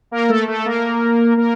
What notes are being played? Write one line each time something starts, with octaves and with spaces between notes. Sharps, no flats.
A#3 A#4
A3 A4
A3 A4
A#3 A#4
A#3 A#4